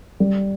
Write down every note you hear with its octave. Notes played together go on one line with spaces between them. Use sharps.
G3